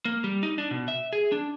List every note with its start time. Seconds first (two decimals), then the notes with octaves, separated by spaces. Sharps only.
0.05 A#3
0.24 G3
0.43 D#4
0.58 D4
0.71 B2
0.88 E5
1.13 G#4
1.32 D4